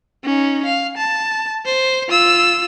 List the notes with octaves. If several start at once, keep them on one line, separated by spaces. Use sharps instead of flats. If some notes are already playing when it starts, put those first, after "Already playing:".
C#4 D#4
F5
A5
C5
F4 E6